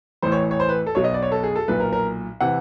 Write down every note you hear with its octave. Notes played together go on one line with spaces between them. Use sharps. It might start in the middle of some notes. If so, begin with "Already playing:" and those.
A1 A2 E3 C5
C#5
C#5
C5
B4
A4
B1 B2 C#5
D#5
D5
C#5
A4
G#4
A4
B1 A#2 B4
A#4
A#4
C3 E3 F#5